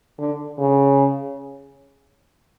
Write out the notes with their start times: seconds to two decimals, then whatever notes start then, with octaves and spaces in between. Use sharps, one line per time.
0.18 D3
0.58 C#3